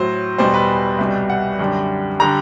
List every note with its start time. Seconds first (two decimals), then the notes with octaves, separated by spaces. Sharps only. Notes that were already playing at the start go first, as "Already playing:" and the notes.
Already playing: A2 F#3 C5
0.38 E2 B2 G3 C5
0.54 B4
0.98 C2 B2 G3
1.30 F#5
1.59 F#2 D3 G3
2.20 D3 G3 A#5